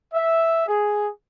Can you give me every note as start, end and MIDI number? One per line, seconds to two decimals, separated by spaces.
0.13 0.65 76
0.67 1.08 68